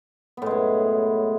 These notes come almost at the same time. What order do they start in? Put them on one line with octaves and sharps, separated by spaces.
B3 A2 G#3 F#2